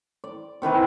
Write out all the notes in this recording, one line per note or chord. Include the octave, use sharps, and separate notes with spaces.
D5
C3 D#3 E3 B4